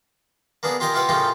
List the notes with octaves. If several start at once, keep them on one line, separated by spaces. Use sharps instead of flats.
A#3 B3 D4 G#4
F4 G4 A#4 D#5 G#5
E4 F4 G4 B4 F5 F#5
A2 C#3 A#3 D#4 F4 G4